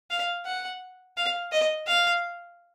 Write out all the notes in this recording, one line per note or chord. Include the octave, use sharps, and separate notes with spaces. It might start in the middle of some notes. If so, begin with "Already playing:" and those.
F5
F#5
F5
D#5
F5